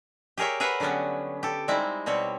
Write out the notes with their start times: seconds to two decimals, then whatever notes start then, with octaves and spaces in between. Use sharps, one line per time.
0.37 G4 G#4 A#4 C#5 E5
0.60 G#4 A#4 B4 E5 F#5
0.80 D3 F#3 G3 B3 C#4
1.43 G4 A4
1.68 G3 G#3 C4 D#4 E4
2.06 B2 G3 C4 C#5